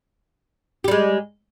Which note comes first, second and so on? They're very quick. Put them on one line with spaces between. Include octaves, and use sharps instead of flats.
G4 G3 G#3